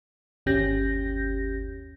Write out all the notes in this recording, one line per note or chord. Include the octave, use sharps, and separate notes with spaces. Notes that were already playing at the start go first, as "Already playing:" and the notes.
G1 D#2 C#4 G4 G6 A#6